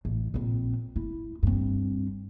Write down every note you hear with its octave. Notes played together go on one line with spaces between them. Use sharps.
A1
A#1 C4
E4
G2 C4